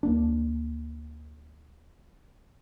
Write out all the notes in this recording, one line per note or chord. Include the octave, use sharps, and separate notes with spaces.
D2 A#3 D4